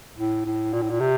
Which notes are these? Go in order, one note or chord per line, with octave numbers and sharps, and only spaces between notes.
A2
A2
A#2
A2
A#2
C3